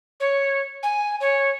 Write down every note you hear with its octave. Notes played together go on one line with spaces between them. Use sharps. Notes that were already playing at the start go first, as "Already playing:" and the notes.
C#5
G#5
C#5